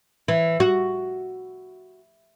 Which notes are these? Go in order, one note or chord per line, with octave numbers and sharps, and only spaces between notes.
E3
F#4